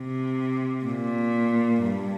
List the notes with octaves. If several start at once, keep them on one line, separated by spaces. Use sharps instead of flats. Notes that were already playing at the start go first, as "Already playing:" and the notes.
Already playing: C3
A#2
G2